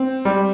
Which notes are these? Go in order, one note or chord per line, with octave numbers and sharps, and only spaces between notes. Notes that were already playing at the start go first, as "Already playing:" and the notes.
Already playing: C4
G3